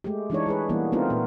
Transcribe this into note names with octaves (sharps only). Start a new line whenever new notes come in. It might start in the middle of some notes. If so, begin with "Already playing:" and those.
G#3 A3 G4
E3 G#3 D4 D#4 C#5
G#3 G#4 B4
E3 G3 A#3 B3
A3 B3 C4 D#4 F4 A#4
A#2 B3